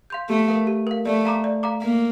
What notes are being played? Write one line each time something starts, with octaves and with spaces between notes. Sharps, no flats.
F5 C6 G6
A3 G4
A#4 F5
G4
A#4 F5
A3 D5
F5 A#5 D6
D5
F5 A#5 D6
A#3 F5